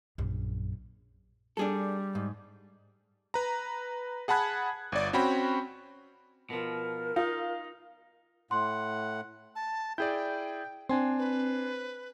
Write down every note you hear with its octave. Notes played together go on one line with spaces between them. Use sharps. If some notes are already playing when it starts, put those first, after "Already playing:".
A#1 F#2
G3 D4 G#4 A4
G#2
B4 A#5
G#4 F#5 A5 B5 F#6 G#6
G1 D5
C4 C#4 F#4 G5 B5
B2 F3 A#4
D#4 F4
A2 F#5 C6
A5
E4 G#4 D5 G5 G6
C4 D4 G#5 C6
B4